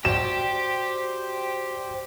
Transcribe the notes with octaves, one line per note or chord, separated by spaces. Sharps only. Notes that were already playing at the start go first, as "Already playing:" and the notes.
F#4 G4 C5 D5 E7